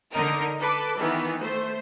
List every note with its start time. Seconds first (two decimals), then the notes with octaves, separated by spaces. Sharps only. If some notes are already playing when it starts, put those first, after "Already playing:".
0.11 D3 D#4 A#4
0.59 A4 B4 D6
0.98 D#3 E3 B3
1.40 A3 C5